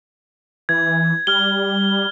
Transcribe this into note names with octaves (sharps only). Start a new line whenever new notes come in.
E3 G#6
G3 F6 G7